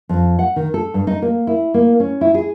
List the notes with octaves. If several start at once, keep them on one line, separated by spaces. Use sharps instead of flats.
F2
F#5
D#3
A4
G2
D#4
A#3
E4
A#3
C#4
E4
G#4